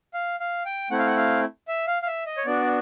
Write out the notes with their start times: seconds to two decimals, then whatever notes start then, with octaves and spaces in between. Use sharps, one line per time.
0.14 F5
0.40 F5
0.65 G5
0.90 A3 C4 E4 F#5
0.98 F5
1.06 F#5
1.17 F5
1.68 E5
1.87 F5
2.02 F5
2.06 E5
2.26 D#5
2.37 C#5
2.45 B3 D4 F#4 D5